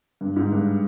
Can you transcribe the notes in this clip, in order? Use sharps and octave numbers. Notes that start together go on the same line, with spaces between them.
G2
G#2
G2